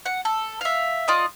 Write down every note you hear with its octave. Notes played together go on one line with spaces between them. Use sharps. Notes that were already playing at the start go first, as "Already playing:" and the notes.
F#5
A4
E5 F5
F4 D5 D#5